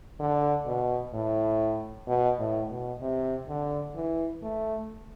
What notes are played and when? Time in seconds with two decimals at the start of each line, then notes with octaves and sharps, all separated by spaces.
0.20 D3
0.67 B2
1.14 A2
2.08 B2
2.39 A2
2.70 B2
3.01 C3
3.49 D3
3.95 E3
4.42 A3